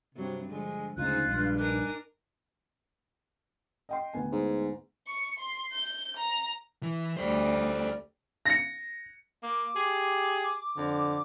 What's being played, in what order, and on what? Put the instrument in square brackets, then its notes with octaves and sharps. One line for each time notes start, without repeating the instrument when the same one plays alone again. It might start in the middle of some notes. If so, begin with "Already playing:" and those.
[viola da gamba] G2 F#3 [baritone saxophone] C3
[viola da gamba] D3 F3 [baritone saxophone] G#3
[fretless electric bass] D2 C#3 [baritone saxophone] G#2 [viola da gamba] D#4 [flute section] F4 F#6
[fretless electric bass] A#1 [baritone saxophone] G2 [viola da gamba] G#3
[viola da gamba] D4 D#4 A#4 [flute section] G#5 D6 F#6
[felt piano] D#5 G5 C6
D2 B3 G#5
[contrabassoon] G#2
[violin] C#6
C6
G6
A#5
[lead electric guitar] E3
[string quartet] D2 G3 [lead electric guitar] A4 C5
[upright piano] A#6 C#7
[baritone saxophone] A#3 [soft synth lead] D6
[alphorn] G4 [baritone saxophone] G#4
[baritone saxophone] F2 [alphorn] D3